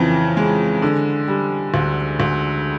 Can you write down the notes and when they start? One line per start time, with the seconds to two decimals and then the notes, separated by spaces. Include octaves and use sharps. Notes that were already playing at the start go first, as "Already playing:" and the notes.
Already playing: F2 C#3 E3
0.37 G#3
0.82 D3
1.28 G3
1.74 D2
2.20 D2